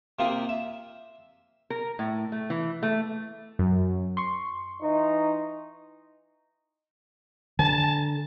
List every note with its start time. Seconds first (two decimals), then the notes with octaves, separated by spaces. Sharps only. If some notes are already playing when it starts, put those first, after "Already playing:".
0.19 C3 A#3 F4 G4 F5 D#6
0.49 E5
1.70 A#4
1.99 A2
2.32 A3
2.50 E3
2.83 A3
3.59 F#2
4.17 C6 C#6
4.81 E3 D#4
7.59 D3 A5